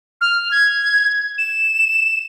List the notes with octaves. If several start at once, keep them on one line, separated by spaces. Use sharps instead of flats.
F6
G#6
E7